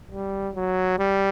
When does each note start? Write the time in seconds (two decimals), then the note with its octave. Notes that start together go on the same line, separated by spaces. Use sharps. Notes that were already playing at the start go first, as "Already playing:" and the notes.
0.11 G3
0.55 F#3
0.99 G3